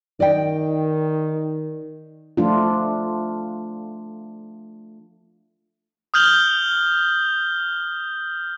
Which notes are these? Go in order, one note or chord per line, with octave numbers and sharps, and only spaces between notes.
D#3 D5 D#5 G5
F3 A3 D4 F4
D#6 F6 G6 F#7 G7